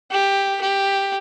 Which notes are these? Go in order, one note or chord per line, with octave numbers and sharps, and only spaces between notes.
G4
G4